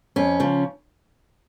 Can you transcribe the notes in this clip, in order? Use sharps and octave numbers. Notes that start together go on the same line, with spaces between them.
F2 C#4
C#3 F3